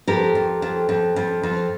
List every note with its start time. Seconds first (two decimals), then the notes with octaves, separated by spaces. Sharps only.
0.07 F2 G4 A#4
0.35 F2
0.62 F2
0.89 F2
1.16 F2
1.43 F2